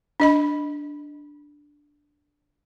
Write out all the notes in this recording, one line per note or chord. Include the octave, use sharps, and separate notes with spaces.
D4 D#5 B5